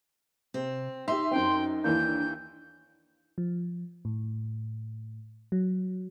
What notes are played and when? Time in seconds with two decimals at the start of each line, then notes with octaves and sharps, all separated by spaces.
0.54 C3 C4
1.08 D#4 G4 E5 C6
1.31 F#2 C4 G5
1.84 D#2 E3 A#3 D4 G6
3.38 F3
4.05 A2
5.52 F#3